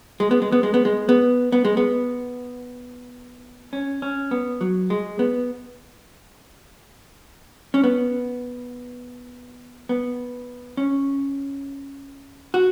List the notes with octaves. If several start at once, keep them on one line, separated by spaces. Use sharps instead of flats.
G#3
B3
G#3
B3
G#3
B3
G#3
B3
B3
G#3
B3
C#4
C#4
B3
F#3
G#3
B3
C#4
B3
B3
C#4
F#4